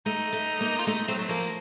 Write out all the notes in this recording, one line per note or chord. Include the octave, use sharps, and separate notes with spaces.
A3 D#4
A3
A#3
F4
A3 D#4
F#3 C4
A3
F3 A#3